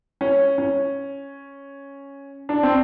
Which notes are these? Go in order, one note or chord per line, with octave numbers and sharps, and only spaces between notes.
C#4
C#4
D4
C4